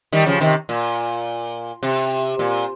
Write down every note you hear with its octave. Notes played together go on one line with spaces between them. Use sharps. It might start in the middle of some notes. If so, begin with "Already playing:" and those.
D#3 G3
C#3 F3
C3 D#3
A#2
C3
A#2